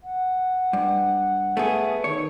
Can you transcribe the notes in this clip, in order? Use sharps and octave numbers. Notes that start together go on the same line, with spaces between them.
F#5
G2
A3 B3 G#4
D#3 C#5